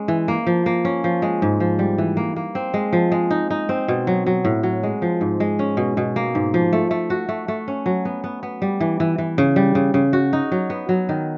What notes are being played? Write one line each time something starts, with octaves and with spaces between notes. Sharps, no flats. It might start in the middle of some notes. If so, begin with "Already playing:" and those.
Already playing: G#3 C#4
E3
A#3
F3
A#3
C#4
F3
G#3
G#2
F3
G3
E3
A#3
A#3
C4
G#3
F3
G#3
D#4
D#4
C4
B2
F#3
F#3
A2
F#3
G#3
F3
G#2
G#3
C#4
B2
B2
A#3
G#2
F3
A3
A3
F#4
A3
A3
C#4
F#3
B3
B3
B3
G3
E3
E3
E3
C#3
G3
C#3
C#3
F#4
D#4
F#3
B3
F#3
D#3